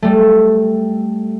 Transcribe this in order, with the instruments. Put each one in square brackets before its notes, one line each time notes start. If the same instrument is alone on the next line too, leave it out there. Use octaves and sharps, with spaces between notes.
[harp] G3 A3